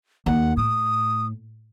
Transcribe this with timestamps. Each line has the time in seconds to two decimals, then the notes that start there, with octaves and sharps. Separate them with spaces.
0.26 D#2 F#5
0.57 A2 D#6